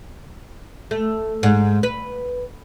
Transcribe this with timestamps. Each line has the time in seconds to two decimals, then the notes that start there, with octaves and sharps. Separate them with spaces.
0.91 A3
1.43 G#2
1.83 B4